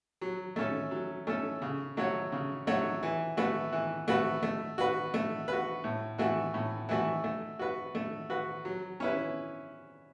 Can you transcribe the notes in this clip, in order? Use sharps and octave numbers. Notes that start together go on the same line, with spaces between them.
F#3
A3 C#4 A4
F#3
A3 C#4 A4
C#3
F#3 A3 F#4 C#5
C#3
F#3 A3 F#4 C#5
E3
A3 F#4 B4
E3
A3 F#4 B4
A3
F#4 B4
A3
F#4 B4
A2
E3 A3 F#4
A2
E3 A3 F#4
A3
F#4 B4
A3
F#4 B4
F#3
C#4 E4 B4